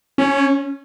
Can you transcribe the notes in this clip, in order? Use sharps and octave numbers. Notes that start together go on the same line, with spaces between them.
C#4